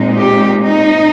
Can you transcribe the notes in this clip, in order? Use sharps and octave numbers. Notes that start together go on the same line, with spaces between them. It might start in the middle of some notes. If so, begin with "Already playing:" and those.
Already playing: A#2 G#3 C4 D#4
G4
D#4